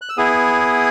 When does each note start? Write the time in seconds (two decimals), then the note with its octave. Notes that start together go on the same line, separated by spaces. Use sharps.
0.02 F#6
0.09 E6
0.18 B3 E4 G#4 D#6